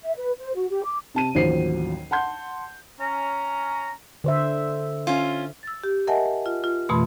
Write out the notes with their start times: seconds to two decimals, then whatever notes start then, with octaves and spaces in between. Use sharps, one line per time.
0.03 E5
0.16 B4
0.38 C5
0.55 F#4
0.70 G4
0.84 D6
1.14 C3 A5 D#7
1.35 A1 D#2 F3 F#3 C5 C7
2.11 F#5 A5 C6 G6
3.00 C#4 A#5
4.24 D3 C5 E5
5.07 C#4 F4
5.63 E6 A6
5.84 G4
6.07 A#4 D#5 E5 F#5 G#5 A5
6.46 F4
6.64 F4
6.89 F2 B2 E3 A3 B5 C6